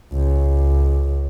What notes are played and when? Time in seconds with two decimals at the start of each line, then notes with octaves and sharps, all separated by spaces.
0.14 C#2